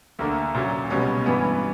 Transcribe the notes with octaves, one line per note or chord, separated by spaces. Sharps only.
D2 D3 A#3
A#2 F#3 C#4
C#2 B2 G3 C#4
G2 E3 B3